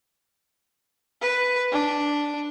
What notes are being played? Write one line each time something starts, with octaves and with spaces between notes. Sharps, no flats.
B4
D4